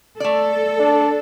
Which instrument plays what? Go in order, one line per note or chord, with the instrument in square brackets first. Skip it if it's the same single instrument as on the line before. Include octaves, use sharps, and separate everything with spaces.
[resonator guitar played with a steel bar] A3 D5 [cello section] A4
[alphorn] D4